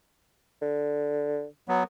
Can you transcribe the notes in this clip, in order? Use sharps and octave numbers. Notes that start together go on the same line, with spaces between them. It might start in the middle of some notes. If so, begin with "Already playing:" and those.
D3
F#3 B3